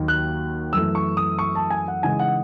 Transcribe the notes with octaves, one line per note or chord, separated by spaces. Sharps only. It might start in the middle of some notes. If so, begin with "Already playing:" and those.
Already playing: D#2 D#3 F#3
F#6
F#2 E3 A3 E6
C#6
D#6
C#6
A5
G#5
F#5
C#3 E3 G#3 D#4 G#5
F#5